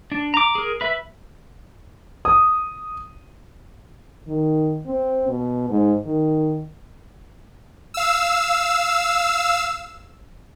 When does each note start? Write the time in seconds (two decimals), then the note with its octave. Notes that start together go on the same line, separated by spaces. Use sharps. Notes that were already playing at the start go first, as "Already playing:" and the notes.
0.12 D4
0.34 A#5 D6
0.55 G#4 A#4
0.81 B4 E5
2.25 D#6
4.28 D#3
4.87 C4
5.28 B2
5.70 G#2
6.06 D#3
7.94 F5 E6